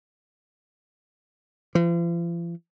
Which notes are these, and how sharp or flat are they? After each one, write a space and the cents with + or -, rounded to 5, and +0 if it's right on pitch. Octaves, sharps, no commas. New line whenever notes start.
F3 -45